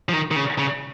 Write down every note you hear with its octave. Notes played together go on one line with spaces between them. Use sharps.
F3
D#3
D#3
C#3
C#3